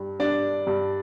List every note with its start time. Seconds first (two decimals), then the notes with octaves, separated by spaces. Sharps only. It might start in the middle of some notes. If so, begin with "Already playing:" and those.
Already playing: G2
0.20 G2 D4 D5
0.67 G2